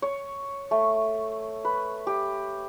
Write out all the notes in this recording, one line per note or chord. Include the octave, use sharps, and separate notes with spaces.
C#5
A3
B4
G4